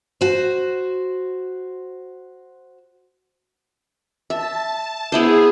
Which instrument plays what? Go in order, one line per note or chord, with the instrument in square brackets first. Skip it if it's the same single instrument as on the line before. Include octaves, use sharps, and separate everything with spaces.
[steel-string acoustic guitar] F#4 C5
[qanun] E5 [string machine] A5
[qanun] B3 E4 C5 [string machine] G#4